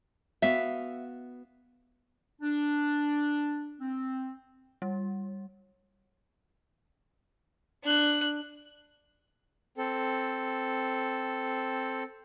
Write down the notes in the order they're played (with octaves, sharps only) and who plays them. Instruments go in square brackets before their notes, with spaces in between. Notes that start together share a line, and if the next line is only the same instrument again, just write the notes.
[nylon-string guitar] B3 F#4 F5 [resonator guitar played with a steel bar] E5
[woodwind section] D4
C4
[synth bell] G3
[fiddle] D4 F#6
[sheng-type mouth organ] C4 A4